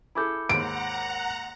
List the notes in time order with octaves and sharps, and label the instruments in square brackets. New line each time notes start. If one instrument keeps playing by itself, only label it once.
[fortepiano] E4 G#4 A4 [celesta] B5 D6 G6
[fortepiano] D#2 G#2 [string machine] F#5 A#5 [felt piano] D7